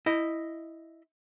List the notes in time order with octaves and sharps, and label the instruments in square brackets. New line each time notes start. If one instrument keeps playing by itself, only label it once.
[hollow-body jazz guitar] E4 D#5